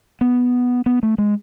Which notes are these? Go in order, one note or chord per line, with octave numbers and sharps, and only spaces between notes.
B3
B3
A3
G#3